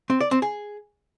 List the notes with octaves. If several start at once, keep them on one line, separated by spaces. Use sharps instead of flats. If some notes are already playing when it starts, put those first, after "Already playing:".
C4
D5
C4
G#4